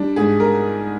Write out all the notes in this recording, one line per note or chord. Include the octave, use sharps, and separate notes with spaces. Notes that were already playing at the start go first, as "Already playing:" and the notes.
Already playing: G3 D4
G#2 G#4
A#4